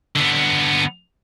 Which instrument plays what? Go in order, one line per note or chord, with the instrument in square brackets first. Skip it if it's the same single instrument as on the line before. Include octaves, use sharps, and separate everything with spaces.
[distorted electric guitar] D3 B3